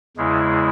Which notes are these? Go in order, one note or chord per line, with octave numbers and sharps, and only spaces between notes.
E2 C#3 G#3 E4